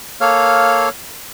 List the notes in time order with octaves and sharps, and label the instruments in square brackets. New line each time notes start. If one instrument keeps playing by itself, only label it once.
[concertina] A#3 A4 C#5 F5 F6